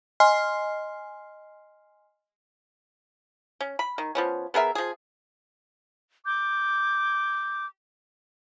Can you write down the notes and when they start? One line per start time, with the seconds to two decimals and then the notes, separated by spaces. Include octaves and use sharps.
0.20 D#5 G#5 C6 F6 C7
3.60 C#4
3.79 B5
3.98 D#3
4.15 F3 B3 C#4
4.54 B3 G#4 A#4 E5
4.75 F3 G#4
6.26 D6 G6